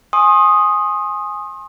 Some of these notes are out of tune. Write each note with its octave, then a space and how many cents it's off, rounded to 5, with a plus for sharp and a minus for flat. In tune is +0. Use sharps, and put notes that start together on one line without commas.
G#5 +0 C6 +35 D#6 +0